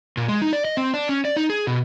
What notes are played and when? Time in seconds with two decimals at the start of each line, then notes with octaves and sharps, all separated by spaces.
0.17 A#2
0.28 G#3
0.42 D#4
0.53 D5
0.65 D#5
0.77 C4
0.94 D4
1.09 C#4
1.25 D5
1.37 D#4
1.50 G#4
1.67 B2